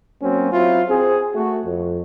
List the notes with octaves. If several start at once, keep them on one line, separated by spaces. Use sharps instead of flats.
F#3 A#3 C4 C#4
F#3 C4 E4 F4
C4 G#4
A3 F#4
F2